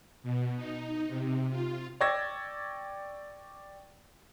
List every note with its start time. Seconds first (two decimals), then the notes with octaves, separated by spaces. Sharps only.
0.23 B2
0.56 D#4
1.07 C3
1.50 F4
2.01 D5 G5 C#6 E6 G#6 A#6